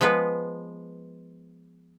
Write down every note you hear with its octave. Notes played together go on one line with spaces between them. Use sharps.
F3 G#3 B3 B4